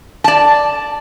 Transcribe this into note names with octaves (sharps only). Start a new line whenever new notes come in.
D5 A5